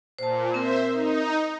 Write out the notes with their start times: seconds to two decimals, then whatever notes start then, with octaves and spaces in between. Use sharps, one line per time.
0.19 A#2 C5 A5
0.54 C4 A#4 C5 E5
0.92 D#4